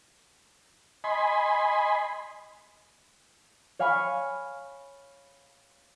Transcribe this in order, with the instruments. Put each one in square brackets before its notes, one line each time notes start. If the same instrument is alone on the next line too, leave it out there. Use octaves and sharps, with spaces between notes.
[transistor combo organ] D#5 G#5 B5 C6
[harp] C#5 F5 G#5 B5 C#6